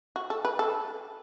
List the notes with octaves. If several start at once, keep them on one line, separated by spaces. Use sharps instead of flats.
F#4
A4
B4
A4